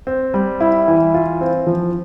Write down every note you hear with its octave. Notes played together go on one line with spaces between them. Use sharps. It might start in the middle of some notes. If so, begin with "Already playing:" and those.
C4
G3
E4
E3
F4
C4
F3